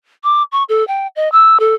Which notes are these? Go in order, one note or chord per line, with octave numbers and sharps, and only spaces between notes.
D6
C#6
A4
G5
D#5
E6
A4